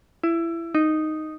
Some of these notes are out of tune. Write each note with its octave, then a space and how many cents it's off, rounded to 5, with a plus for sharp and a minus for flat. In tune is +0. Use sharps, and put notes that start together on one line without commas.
E4 +20
D#4 -5